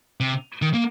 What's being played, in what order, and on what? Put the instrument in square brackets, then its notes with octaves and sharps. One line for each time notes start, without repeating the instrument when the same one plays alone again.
[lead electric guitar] C3
D#3
A#3